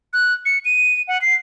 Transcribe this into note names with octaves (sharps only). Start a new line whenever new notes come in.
F#6
C#7
D#7
F#5
C7